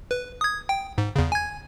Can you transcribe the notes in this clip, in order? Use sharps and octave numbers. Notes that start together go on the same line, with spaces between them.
B4
D#6 G#6
G5
G#2
E2 C#3
G#5 G#6